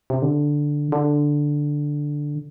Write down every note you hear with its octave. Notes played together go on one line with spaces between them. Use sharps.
C3
D3
D3